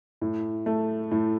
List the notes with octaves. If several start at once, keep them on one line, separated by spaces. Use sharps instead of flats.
A2
A3
A2